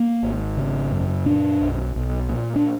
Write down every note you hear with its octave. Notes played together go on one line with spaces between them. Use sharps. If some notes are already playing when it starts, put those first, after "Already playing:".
Already playing: A#3
G#1
C#3
F#2
A#2 D4
B1
B1
A#2
D4